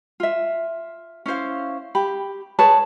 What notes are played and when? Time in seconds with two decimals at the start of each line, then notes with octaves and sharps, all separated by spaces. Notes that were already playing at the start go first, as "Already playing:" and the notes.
0.20 F4 E5
1.26 C#4 E4 C5 F5
1.95 G4 B5
2.59 G#4 B4 C#5 A5